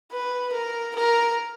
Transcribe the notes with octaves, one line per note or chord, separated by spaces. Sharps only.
B4
A#4
A#4